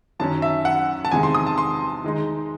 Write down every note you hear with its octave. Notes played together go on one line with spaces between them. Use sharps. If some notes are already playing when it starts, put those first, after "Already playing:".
F#2 D#3 F#3 C#4 A5
E5
F#5
A5
E2 C3 D#3 G#3 G#5
C6
D#6
A5
C6
D#3 G#3 D#4